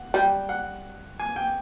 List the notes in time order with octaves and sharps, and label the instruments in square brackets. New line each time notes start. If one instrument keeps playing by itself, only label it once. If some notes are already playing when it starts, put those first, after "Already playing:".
Already playing: [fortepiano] F#5
[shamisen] G3 [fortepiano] G5
[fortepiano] F#5
G#5
G5